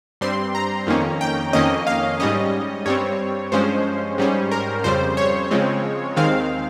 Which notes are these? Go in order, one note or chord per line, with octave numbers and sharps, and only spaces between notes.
G2 G3 C4 C6
A#5
F2 D#3 A#3 C#4
G5
F2 D#3 A#3 C#4 D#5
F5
G#2 G3 C#4 D#5
G2 G3 C4 C#5
G2 F3 G#3 C#4 C5
G#2 G3 C#4
A#4
F2 C#3 G3 C5
C#5
C#3 F3 G#3 C4
D#2 D#3 G#3 C4 F5